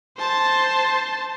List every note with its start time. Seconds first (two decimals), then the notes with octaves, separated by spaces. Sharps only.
0.18 C5 A5